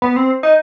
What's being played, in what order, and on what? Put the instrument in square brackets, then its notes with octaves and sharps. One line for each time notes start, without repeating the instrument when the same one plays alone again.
[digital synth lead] B3
C4
D#4